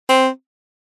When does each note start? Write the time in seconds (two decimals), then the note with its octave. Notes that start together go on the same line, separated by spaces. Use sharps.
0.09 C4